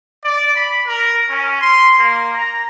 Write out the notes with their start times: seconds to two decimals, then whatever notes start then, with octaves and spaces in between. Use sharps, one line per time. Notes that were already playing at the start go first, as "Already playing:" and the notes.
0.22 D5
0.54 B5
0.85 A#4
1.28 C#4
1.60 C6
1.96 A#3
2.33 A#5